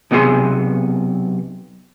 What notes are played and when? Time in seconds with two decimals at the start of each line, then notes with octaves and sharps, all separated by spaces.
0.11 B1 C3 B3 G4 G#4 C6